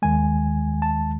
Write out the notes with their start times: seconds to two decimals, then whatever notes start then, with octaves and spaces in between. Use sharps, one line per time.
0.02 D#2 D#3 G#3 G#5
0.82 A5